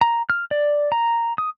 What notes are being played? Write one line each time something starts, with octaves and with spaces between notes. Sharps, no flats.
A#5
F6
D5
A#5
D#6